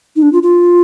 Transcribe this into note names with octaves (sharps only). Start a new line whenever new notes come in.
D#4
D4
F4
F4